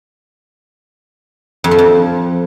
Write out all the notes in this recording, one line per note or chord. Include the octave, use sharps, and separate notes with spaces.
F2
F3
F2